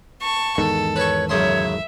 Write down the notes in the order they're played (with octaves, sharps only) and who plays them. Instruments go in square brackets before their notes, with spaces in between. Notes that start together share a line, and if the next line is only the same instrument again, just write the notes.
[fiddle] A5 C#6
[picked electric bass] E2 G#2 D#3 [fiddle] A4
[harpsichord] B4 C#6 [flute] C#5
[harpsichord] F#2 C#3 C6 [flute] C#5 [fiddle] E5